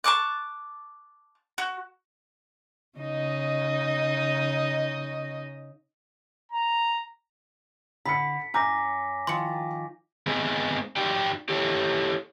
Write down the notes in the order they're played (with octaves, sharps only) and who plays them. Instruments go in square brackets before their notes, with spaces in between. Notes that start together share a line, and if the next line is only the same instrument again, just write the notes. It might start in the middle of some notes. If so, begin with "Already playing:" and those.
[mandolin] A5 C#6 D6 F#6
F#4
[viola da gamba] C#3 D#4 D#5
[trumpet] A#5
[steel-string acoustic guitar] D3 [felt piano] B5 C#7 [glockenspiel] B6
[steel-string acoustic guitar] F#2 [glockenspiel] G#5 D6 A#6 [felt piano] A#5 G6
[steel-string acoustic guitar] D#3 F3 [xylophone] C6 C#7
[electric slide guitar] G#3 B3 C4 D#4 G#4
D#4 F#4 G4 D5 G5
E4 G4 A4 C#5